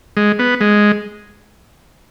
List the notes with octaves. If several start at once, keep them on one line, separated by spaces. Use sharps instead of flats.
G#3
B3
G#3